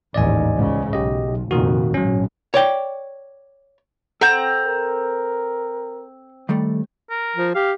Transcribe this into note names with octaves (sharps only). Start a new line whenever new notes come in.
A1 D#2 G#2 D5 D#5 G#5
C#2 G#2 C#3
B1 G4 D#5
F1 F2 A#2 D#3 F#4
G#1 A#2 F#3 C#4
C#5 D5 G5
C4 A4 F#5 A#5
A#4
D#3 G3 A3
A#4
F3
G4 F5